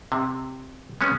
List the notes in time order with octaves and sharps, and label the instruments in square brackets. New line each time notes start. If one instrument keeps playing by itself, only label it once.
[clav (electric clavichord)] C3
G#3 B3 C#4